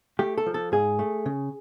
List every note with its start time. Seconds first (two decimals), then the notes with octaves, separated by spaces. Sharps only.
0.19 A3 G4
0.38 A4
0.46 F3
0.54 A4
0.72 G#2 G#4
0.99 A3
1.26 C#3